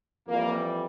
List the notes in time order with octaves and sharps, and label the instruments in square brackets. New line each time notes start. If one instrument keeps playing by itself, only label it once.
[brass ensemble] F2 E3 G3 A#3